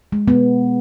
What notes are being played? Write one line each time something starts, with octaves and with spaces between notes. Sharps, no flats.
G#3
B3